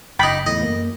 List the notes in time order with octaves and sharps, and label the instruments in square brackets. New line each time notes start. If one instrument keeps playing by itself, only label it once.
[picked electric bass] F#1 [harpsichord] D#4 D6 [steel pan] G5 B5
[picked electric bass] E2 A2 [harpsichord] D#5
[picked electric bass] F#2 A#3